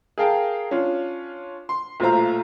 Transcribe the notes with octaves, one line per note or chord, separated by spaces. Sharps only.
G#4 A#4 F5 G5 A5
C#4 D4 F4
C6
B1 A#2 A3 F4 C5 A#5